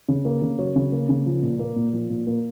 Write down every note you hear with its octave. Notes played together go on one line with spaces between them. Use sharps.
C#3
A#3
C#3
F#3 C#5
C#3
A#3
C#3
F3
A#2
A#3
A#2
F3
A#2
A#3